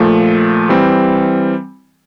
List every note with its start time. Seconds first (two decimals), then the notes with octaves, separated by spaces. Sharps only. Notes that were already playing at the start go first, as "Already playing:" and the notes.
Already playing: A#2 F3 A3
0.69 E3 G3 C4